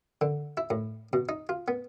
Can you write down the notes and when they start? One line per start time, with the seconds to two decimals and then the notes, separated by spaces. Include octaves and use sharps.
0.21 D3
0.57 E4
0.70 A2
1.13 B2
1.29 D#4
1.49 F4
1.68 B3